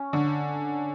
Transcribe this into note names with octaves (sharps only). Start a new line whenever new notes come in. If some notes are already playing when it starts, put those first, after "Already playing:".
Already playing: C#4
D3